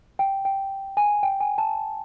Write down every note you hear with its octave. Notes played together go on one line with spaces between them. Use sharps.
G5
G5
G#5
G5
G#5
A5